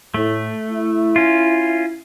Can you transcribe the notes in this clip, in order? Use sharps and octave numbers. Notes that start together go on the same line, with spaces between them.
A2 A3
E4
C#4 F4